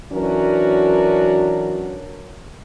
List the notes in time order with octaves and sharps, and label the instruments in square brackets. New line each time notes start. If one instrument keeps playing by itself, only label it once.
[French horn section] E3 F#3 C#4 D4 F#4 A#4